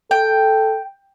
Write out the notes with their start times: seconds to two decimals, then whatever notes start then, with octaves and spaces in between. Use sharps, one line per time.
0.11 A4 G5